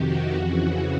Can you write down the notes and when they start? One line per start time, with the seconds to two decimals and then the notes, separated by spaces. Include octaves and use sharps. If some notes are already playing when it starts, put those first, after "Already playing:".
Already playing: F2 C3 D#3 F#4 G4
0.33 F2 C#3 E3